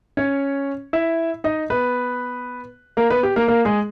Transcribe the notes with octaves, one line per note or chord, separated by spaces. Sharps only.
C#4 C#5
E4 E5
D#4 D#5
B3 B4
A#3 A#4
B3 B4
G4
A#3 A#4
A#3 A#4
G#3 G#4